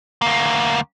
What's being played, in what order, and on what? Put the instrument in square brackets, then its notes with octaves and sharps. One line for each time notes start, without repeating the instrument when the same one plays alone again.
[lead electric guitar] D2 A#3